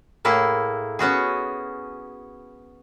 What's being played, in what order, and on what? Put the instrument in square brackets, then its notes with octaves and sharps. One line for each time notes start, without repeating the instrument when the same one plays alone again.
[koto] A2 A#3 E4 G#4
B3 C#4 F#4 G#4